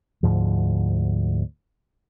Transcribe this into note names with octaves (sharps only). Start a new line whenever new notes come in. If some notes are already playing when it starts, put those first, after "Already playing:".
D2 G#2 F3